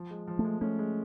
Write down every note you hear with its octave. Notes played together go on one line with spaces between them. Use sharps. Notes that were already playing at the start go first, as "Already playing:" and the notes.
Already playing: F3
G#3
F3
A3
G#3
A3 C#4
G#3